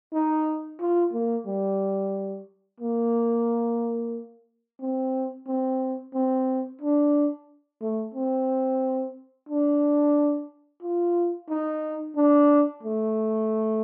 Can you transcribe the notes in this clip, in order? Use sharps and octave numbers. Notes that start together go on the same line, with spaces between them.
D#4
F4
A#3
G3
A#3
C4
C4
C4
D4
A3
C4
D4
F4
D#4
D4
A3